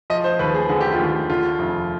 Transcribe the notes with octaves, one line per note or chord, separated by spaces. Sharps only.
F3 D#5
C5
D#2 B4
G#4
D3 G#4
G4
F4
D#2 G4
D3 F4
F1